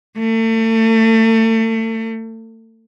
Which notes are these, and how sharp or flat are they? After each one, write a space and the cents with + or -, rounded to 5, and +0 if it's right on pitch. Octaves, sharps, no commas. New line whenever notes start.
A3 +35